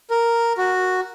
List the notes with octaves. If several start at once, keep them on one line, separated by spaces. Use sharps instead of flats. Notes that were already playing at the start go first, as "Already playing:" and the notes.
A#4
F#4